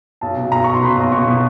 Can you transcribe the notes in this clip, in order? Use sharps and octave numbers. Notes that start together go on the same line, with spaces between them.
B1 A5
B2
B1 A#5
B1 C#6
C6
B2 B5
B1
B2 C#6
B2